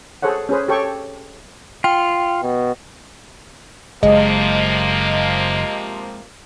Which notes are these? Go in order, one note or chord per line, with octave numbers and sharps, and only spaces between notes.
G#4 A4 C5 C#5 F#5
C#4 G#4 B4 C5
G4 A4 C#5 G5 C#6
F4 G5
B2
F#1 C3 F3 G#3 A#3 D#5